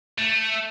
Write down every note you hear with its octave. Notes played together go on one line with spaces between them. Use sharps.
A3